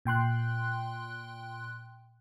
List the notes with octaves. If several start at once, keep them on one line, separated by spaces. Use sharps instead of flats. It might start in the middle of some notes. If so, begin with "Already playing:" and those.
A#2 G5 C6 F#6